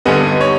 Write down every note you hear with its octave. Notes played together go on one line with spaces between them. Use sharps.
G2 D3 G3 B3 D#5
C#5